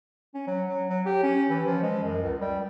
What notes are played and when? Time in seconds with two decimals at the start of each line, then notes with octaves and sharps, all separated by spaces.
0.34 C#4
0.47 F#3
0.68 F#3
0.90 F#3
1.05 G4
1.23 C#4
1.50 E3
1.66 F3
1.82 G#3
2.03 F#2
2.23 C#2
2.40 G3